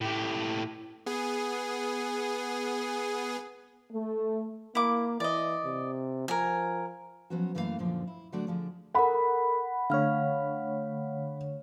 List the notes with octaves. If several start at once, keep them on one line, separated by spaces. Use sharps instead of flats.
A2 G4
B3 G#4
A3
A#3 E4 D6
E3 D5 D#5
C3
F3 A#4 G#5
F3 F#3 B3 C#4 F#4
F#2 E3 A3 A#3 A4 F5
F#2 A#2 D3 F3
E4
D3 F#3 A3 D4 F#4 D5
D3 F3 G#4
A4 A#4 F#5 B5
D3 A3 C#5 F5 F6